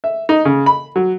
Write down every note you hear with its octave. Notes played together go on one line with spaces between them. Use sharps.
E5
D#4
C#3
B5
F#3